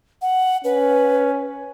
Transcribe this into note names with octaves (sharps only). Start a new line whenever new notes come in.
F#5
C#4 B4